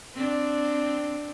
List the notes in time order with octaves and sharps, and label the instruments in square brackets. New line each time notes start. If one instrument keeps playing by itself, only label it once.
[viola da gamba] C4 D4